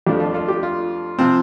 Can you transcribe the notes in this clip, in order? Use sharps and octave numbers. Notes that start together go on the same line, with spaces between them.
F2 F3 A3 D4 G4
F4 A4
F4 A4
G4
F4
C3 F3 C4